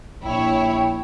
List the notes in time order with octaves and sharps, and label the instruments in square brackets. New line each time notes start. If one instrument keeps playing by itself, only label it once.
[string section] A#1 E4 C#5 [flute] G5